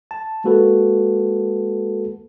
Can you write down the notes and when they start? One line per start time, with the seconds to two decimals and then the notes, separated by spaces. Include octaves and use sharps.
0.11 A5
0.44 G#3 A#3 F#4 A4 B4